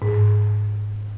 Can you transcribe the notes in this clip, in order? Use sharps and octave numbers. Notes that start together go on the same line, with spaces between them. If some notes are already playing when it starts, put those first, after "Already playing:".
G#2